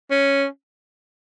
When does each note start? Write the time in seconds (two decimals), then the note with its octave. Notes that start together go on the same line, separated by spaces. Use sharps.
0.11 C#4